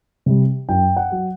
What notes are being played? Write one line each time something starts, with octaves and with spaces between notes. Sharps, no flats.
C3 G3
F#2 G5
F#5
F#3